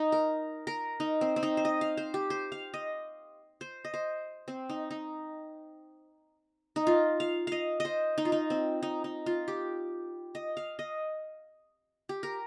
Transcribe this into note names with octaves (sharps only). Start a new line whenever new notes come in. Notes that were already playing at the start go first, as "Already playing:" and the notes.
Already playing: D#4
A#4
A#4
D#4
C4
C4
D#4
C5
D#5
F5
C5
G4
C5
F5
D#5
C5
D#5
C5
C4
D#4
D#4
D#4
F4
F5
D#5 F5
C5 D#5
D#4
F4
D#4
C4
D#4
D#4
F4
G4
D#5
F5
D#5
G4
A#4